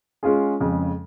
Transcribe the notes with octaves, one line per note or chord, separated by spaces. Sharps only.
G#3 C#4 F4 G#4
F2 C#3 G#3